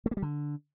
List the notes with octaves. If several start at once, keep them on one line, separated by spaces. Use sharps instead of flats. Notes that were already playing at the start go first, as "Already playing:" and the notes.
A3
A#3
G3
D3